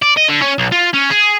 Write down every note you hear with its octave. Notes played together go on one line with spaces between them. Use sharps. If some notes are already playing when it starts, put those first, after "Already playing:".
D5
D#5
D3
C#4
B1
F4
C#4
G#4